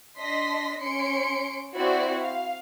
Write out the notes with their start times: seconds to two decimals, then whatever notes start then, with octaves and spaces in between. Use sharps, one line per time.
0.19 D4 D#5 C6 A#6 B6
0.82 C#4 C6 C#7 D7
1.75 C4 E4 F#4 D5
2.21 F5